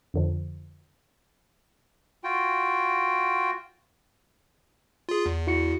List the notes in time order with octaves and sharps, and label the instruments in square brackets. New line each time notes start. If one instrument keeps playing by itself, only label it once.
[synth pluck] F2 D3 F3
[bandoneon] F4 F#4 G5
[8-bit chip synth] F4 G#4
E2
[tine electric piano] E4 F#4 C#7